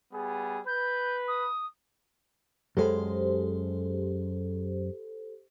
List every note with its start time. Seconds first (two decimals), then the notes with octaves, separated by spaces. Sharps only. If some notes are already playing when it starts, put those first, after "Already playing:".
0.12 G3 B3 G#4
0.67 B4 G6
1.28 D#6
2.77 F#2 G#3 G4 A4 C5 B5